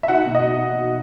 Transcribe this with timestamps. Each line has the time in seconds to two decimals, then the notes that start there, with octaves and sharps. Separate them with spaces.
0.03 E5
0.08 D#4 F#4 F#5
0.26 B2
0.35 D#5
0.43 B2